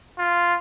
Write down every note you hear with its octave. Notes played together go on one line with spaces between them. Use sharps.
F4